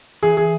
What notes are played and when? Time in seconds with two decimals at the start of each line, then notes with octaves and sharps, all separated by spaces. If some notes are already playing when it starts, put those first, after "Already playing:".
0.23 E3 G#4
0.37 G#4